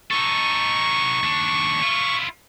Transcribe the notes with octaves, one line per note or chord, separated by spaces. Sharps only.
D#4 A4 C#6
D#2 D4
E4 F4